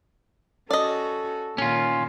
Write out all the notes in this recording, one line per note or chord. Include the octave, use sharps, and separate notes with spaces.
C#4 F#4 A4 D5 D#5
A#2 D#3 C#4 F4